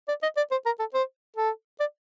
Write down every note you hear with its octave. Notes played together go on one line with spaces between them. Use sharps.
D5
D#5
D5
C5
A#4
A4
C5
A4
D5